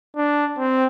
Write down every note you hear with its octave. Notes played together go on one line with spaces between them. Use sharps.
D4
C4